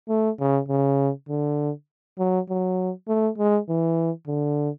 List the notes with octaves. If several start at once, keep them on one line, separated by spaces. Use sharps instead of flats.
A3
C#3
C#3
D3
F#3
F#3
A3
G#3
E3
D3